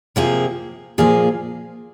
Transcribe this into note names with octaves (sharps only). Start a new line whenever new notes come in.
C3 F3 A#3 F4 G#4
A#2 F3 A#3 F4 G#4